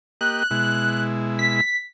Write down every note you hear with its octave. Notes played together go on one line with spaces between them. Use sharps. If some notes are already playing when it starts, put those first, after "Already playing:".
A#3 G4 D#5 F#6
B2 G#3 E4
B6